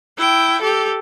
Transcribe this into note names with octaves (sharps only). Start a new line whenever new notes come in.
E4 G5
G4 A4